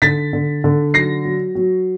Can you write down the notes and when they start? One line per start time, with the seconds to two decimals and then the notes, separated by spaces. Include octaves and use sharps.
0.02 D3 A6 B6
0.33 D3
0.64 D3
0.93 F#3 A#6 C7
1.25 F#3
1.55 F#3